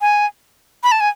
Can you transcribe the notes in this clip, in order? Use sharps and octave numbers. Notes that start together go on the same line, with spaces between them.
G#5
B5
A5
G#5